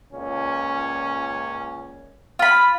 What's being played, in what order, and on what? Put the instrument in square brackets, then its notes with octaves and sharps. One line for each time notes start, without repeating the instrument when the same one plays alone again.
[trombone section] C#2 A#2 C#4
[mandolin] F4 B5